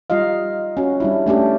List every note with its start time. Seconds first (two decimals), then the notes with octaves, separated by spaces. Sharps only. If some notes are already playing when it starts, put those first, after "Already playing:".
0.10 G3 D#4 F4 D#5 F5
0.77 C#4 F#4
1.00 G3 D4 E4
1.26 A3 C#4 D4 G4